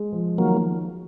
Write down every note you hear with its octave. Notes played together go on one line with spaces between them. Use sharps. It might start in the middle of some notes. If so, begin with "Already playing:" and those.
Already playing: G#3
F3
D#3 F#3 A#3